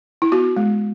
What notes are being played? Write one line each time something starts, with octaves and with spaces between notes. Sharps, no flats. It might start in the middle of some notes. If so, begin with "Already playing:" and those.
E4
B3 F#4
G#3